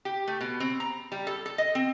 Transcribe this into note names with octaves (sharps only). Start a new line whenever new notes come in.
G4
A3
B2
C4
A#5
G3
A4
A4
D#5
C4